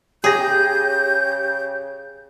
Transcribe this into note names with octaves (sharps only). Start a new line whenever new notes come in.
C#3 G4 G#4 G6 A#6